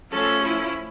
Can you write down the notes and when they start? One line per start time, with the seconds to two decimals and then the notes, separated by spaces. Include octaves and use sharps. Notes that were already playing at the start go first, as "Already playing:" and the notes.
0.13 F3 A3 C#4 A4
0.46 E4